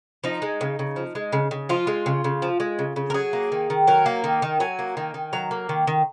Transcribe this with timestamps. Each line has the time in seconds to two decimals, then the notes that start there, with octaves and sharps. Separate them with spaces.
0.24 F3 D#4
0.42 G#3
0.61 C#3
0.79 C#3
0.96 F3
1.15 G#3
1.33 C#3
1.51 C#3
1.69 F3 F4
1.87 G#3
2.06 C#3
2.24 C#3
2.42 F3
2.60 G#3
2.79 C#3
2.96 C#3
3.10 A#4
3.14 F#3 G#4
3.33 A#3
3.52 D#3
3.70 D#3
3.87 F#3 A#4
4.06 A#3
4.24 D#3
4.42 D#3
4.60 F#3 G#5
4.79 A#3
4.97 D#3
5.14 D#3
5.33 F#3 A#5
5.51 A#3
5.69 D#3
5.87 D#3